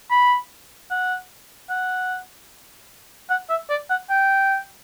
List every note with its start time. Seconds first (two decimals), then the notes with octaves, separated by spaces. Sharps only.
0.11 B5
0.91 F#5
1.70 F#5
3.30 F#5
3.50 E5
3.70 D5
3.90 F#5
4.10 G5